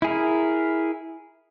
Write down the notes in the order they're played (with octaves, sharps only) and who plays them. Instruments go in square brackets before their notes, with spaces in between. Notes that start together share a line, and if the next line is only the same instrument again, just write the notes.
[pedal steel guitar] E4 G#4 A#4